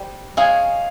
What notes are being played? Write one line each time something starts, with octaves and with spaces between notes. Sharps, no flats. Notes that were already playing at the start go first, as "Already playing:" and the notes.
Already playing: G3 G4 C5
G#3 C#4 G#4 C#5 F5